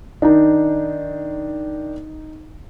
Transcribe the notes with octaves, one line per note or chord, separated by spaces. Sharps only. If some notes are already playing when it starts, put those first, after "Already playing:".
D#3 D4 D#4